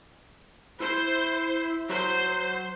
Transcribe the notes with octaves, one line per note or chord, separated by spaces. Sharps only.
E4 C5
F#3 C5